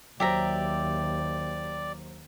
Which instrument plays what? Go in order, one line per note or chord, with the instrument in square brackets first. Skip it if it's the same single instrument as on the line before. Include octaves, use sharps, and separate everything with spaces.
[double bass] D#2 [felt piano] F#3 C5 [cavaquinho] G4 E5 A#5 [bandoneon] D5